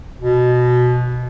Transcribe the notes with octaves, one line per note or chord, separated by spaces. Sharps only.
B2